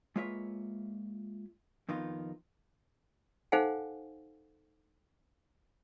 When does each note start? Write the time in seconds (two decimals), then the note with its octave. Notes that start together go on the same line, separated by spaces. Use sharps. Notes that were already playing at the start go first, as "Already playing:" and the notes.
0.16 G#3 A#3 F4 B4 C#5 E5
1.89 F2 D#3 B3 D#4 F4
3.52 D#4 A4 C5 F5 F#5 G#5